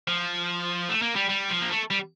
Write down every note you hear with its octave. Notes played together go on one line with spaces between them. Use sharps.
F3
A3
A#3
G3
G3
F3
A#3
A3
G3